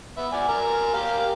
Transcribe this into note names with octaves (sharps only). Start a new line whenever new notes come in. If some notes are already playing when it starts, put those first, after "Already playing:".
B3 E5
D5 F#5 G#5
A#4 G#5
G4 A#4 F5